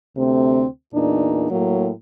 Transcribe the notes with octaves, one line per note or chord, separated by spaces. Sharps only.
D2 C3 A3 C4
E2 A#2 D4 D#4
A2 F#3 A#3